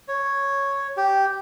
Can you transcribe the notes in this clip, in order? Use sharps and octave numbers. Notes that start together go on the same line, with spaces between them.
C#5
G4